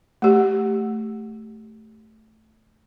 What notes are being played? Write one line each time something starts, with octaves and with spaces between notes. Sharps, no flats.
A3 G4